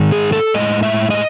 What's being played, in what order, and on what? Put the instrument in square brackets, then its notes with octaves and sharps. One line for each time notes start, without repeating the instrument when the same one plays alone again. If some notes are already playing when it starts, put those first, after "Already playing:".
Already playing: [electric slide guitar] G#2 D#3 G#3
G#4
A4
A2 G#3 D#5
E5
D#5